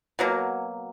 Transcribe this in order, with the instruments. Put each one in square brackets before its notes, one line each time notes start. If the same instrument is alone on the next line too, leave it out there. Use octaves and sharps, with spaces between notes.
[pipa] B2 F#3 A#3